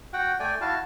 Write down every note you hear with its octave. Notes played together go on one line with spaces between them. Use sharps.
F#4 F#5 G5
A3 D5 G5 G#5
E4 F#4 F5 A5